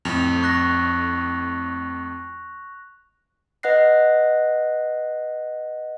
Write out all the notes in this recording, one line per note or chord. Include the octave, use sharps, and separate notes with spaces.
F2 A2 F7
C#6 F#6 A#6
B4 D#5 F#5 F#6 A#6 C7